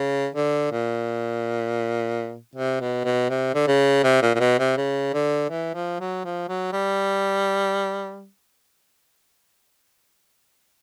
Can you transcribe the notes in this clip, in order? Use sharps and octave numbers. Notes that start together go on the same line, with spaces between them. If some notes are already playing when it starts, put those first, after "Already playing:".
Already playing: C#3
D3
A#2
C3
B2
B2
C3
D3
C#3
C3
A#2
A#2
B2
C3
C#3
D3
E3
F3
F#3
F3
F#3
G3